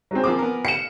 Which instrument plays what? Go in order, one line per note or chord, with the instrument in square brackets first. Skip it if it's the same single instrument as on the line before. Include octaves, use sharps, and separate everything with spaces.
[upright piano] F#3 G#3 C4
[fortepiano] F3 A#3 C4 [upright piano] G#5 D6
[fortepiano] B3 A#4
[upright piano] F5 [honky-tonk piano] C#7 E7